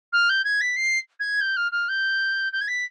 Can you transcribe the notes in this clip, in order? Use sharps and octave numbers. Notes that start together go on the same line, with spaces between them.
F6
G6
G#6
B6
C7
G#6
G6
F6
F6
G6
G6
G#6
B6